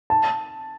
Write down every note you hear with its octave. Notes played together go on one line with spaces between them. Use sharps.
A5